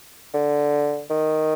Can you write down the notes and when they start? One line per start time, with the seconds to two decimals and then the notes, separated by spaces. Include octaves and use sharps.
0.34 D3
1.10 D#3